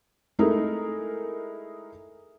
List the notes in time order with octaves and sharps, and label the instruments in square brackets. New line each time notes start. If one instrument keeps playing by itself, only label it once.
[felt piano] G#3 A3 D#4 E4 G#4 A#4